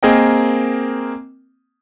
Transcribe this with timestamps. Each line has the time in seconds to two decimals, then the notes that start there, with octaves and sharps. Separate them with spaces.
0.03 A#3 C4 G#4 A#4 D#5 G5